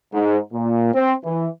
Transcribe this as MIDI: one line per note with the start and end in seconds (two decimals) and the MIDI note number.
0.13 0.37 44
0.53 0.92 46
0.94 1.13 60
1.24 1.47 52